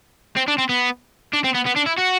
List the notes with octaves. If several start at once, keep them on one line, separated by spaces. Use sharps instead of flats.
C4
D4
C4
B3
D4
C4
B3
B3
D4
E4
F#4